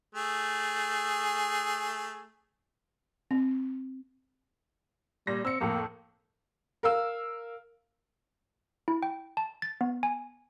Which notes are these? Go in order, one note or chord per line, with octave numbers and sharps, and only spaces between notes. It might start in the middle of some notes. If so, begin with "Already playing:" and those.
A3 G#4
C4
A#2 G3 A#6
C4 E6 C#7
F2 A2 A#3
A#4 F5 E6
E4
G5
A5
A6
B3
G#5